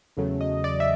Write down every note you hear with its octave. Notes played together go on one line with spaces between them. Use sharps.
E2 C#3 F#3 A3
D#5
D5
E5